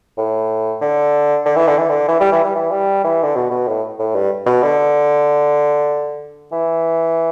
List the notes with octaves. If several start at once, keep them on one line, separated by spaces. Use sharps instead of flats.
A2
D3
D3
E3
D3
E3
D3
E3
G3
E3
G3
E3
G3
E3
D3
B2
B2
A2
A2
G2
B2
D3
E3